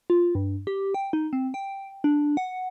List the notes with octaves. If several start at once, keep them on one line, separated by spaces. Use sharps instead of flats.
F4
G2
G4
G5
D#4
C4
G5
D4
F#5